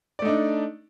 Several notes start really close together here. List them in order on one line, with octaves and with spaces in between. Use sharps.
D5 A3 D#4 D4